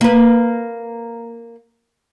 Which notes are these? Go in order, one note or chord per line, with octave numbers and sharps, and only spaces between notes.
A#3 B4